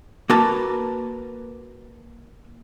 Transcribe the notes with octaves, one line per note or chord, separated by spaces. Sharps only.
A#3 F#4 A#4 B4 A5